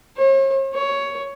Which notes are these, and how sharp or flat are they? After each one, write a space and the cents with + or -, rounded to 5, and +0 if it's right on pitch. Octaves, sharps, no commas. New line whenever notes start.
C#5 -45
C#5 +10